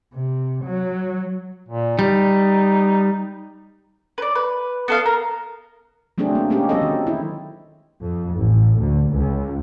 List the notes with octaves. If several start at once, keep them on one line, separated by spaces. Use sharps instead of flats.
C3
F#3
A#2
G3 D#4
B4 D5
B4
B3 A4 F5
A#4
F#3 A3 C4 D4 G#4
A#3
G#3 A#3 C4 C#4 G4
F#3 C4 A4 D#5
D#3
E4
F2
A1
D2
C#2